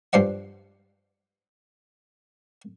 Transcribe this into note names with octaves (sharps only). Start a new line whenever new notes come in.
G2 F3 C5 D5 F#5